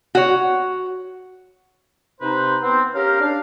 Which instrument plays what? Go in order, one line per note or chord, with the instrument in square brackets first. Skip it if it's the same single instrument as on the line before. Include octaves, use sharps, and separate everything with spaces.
[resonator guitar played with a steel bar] F#4 C#5
[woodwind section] C3 D#4 B4 C5
B3 C4
C#4 G4 A#4 F5
D4 F5